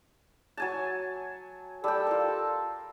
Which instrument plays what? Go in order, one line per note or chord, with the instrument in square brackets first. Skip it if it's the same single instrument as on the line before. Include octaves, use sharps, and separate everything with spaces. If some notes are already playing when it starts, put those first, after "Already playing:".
[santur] F#3 G#5 A5
[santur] G3 G5 [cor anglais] A4
[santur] F4 A#4